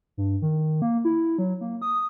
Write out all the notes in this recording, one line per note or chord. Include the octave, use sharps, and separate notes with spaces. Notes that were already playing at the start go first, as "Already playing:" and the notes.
G2
D#3
A#3
E4
F#3
A#3
D#6